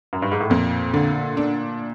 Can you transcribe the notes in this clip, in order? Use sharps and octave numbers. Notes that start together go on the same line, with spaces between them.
F#2
G2
G#2
A2
F2 A#2
D3
D4